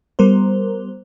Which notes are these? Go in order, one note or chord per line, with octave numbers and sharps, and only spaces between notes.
G3 B3 A#4 C5